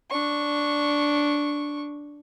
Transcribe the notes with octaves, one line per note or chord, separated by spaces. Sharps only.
D4 C#6